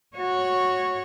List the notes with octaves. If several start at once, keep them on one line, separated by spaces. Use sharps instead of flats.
F#4 C#5